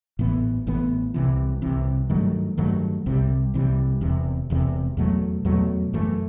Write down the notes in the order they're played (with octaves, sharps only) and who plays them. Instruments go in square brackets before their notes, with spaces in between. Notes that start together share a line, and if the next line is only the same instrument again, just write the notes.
[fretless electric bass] A1 A2 E3 B3
A1 A2 E3 B3
C2 C3 E3
C2 C3 E3
G2 D#3 F#3 A3
G2 D#3 F#3 A3
C2 C3 E3 G3
C2 C3 E3 G3
E1 E2 C3
E1 E2 C3
E2 B2 F#3 A3
E2 B2 F#3 A3
F#2 E3 A3